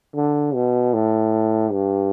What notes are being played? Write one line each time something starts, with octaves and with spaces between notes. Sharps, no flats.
D3
B2
A2
G2